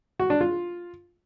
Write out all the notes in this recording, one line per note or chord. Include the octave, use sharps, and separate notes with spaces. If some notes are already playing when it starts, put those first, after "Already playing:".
F#4
D4
F4